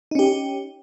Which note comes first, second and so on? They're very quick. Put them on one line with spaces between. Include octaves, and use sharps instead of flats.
D#4 C#4 G4